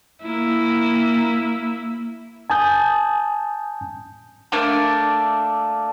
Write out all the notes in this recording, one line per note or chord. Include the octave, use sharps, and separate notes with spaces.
A#3 E4
G#5 A5 D#6 G6
A3 A#3 D4